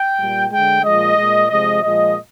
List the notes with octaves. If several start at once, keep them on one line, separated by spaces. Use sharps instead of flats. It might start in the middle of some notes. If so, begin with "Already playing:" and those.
Already playing: G5
A#2 G3
D3 G#3 G5
A#2 F3 G#3 D#5
A#2 G#3
C3 F3 G#3 D#5
A#2 F3 G#3 D#5